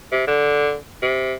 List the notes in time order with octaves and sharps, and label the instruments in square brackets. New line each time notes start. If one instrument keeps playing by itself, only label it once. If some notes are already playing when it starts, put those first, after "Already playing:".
[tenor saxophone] C3
D3
C3